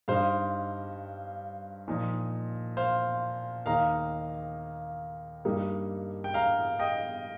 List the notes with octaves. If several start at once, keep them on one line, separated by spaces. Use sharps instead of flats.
G2 G3 D#4 C5 F5
A#2 F3 D#4
C5 F5
D#2 D#3 A#3 D#4 F5 A#5
G2 G3 A#3 D#4
G5
F5 A#5
D#5 G5